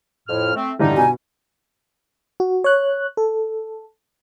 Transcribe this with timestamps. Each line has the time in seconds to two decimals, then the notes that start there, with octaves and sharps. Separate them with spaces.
0.28 F2 A2 F6
0.55 A3 C4
0.80 A1 G2 D3 G3 G#3 D#4
0.97 B2 G#5
2.40 F#4
2.64 C#5 F#6
3.17 A4